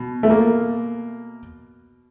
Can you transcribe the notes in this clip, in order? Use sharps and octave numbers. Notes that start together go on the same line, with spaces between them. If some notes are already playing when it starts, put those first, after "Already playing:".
Already playing: B2
A3
A#3